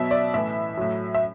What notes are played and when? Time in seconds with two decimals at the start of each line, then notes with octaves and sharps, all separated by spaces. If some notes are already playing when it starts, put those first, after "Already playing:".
Already playing: B2 F#3 E5
0.11 D5
0.34 A2 E3 E5
0.77 A2 F#3
1.14 E5